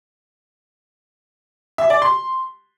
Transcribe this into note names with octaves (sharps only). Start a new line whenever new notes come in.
E5
D5
C6